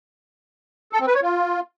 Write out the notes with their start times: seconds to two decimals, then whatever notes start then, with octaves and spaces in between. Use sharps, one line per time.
0.93 A4
1.00 C4
1.07 B4
1.15 C#5
1.22 F4